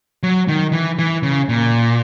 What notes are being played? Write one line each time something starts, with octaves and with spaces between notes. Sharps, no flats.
F#3
D#3
E3
E3
C#3
A#2